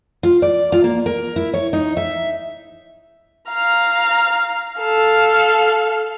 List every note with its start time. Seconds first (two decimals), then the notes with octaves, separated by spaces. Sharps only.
0.23 F4
0.42 D5
0.72 F4
0.84 A#3
1.06 A#4
1.36 E4
1.53 C#5
1.73 D#4
1.97 E5
3.51 F5 A#5
4.81 A4 F5